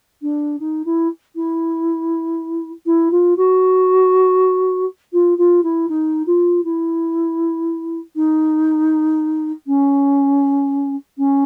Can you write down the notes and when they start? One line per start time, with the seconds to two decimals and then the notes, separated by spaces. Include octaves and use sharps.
0.22 D4
0.59 D#4
0.85 E4
1.35 E4
2.86 E4
3.11 F4
3.36 F#4
5.12 F4
5.37 F4
5.63 E4
5.88 D#4
6.26 F4
6.64 E4
8.15 D#4
9.66 C#4
11.17 C#4